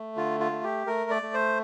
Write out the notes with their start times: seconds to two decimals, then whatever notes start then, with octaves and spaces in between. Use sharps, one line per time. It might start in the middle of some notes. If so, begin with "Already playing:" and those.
Already playing: A3
0.16 D3 F4
0.40 F4
0.52 A3
0.64 G4
0.87 A3 A#4
1.11 D5
1.22 A3
1.34 C5